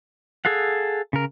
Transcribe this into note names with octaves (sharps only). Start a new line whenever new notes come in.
G#4 A4 F5 F#5
C#3 A#4